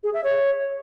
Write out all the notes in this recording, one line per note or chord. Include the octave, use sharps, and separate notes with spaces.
G#4
E5
C#5